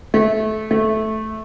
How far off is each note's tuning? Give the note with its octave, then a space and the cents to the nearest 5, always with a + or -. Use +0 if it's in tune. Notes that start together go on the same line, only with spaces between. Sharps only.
A3 -20
A3 -10